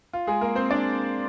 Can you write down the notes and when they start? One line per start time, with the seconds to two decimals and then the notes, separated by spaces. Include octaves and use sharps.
0.13 F4
0.27 G#3 G#4
0.41 A#3 A#4
0.55 C4 C5
0.71 D4 D5